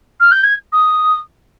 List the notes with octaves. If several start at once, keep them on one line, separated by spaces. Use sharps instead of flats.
F6
G6
G#6
D#6